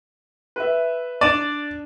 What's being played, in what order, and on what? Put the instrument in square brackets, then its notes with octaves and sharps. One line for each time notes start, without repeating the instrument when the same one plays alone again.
[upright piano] B4 E5
[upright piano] D4 D#7 E7 [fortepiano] D5